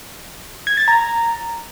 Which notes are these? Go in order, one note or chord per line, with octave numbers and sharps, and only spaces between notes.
G#6
A6
A#5